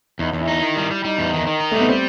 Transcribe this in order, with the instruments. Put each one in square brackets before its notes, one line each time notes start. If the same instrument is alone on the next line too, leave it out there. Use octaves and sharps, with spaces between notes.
[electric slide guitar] E2 [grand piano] D#4
[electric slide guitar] E2
[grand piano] E4
[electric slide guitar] D#4
D#3
G3
G3
[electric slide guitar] G3 [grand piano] D#4
[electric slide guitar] E2
D#3
D#3
D#4
[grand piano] A3
[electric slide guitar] G3
[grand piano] B3
[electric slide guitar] G3 [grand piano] C4